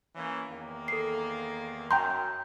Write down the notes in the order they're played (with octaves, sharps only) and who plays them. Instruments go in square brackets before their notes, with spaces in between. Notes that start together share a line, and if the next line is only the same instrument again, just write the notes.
[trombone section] E3 A#3 C#4
E2 D#3 A#3
[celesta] A4 C7
[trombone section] F#2 [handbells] G5 A#5 C6 [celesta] G6